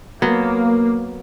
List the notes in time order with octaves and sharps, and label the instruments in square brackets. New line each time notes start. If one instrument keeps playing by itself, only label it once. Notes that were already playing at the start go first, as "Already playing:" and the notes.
[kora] F#3 B3 [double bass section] A#3